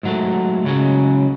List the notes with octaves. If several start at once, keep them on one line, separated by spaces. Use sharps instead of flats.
G#2 F#3 A3
C#2 C#3 F#3